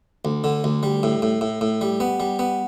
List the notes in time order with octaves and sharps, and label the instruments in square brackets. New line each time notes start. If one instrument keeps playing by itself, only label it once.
[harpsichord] D2
D3
D2
G3
A2
A2
A2
A2
G3
B3
G3
B3